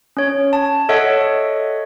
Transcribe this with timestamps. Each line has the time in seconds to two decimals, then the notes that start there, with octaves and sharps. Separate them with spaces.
0.17 C#4 C#5
0.53 A5
0.89 A4 C#5 D#5 E5 F#5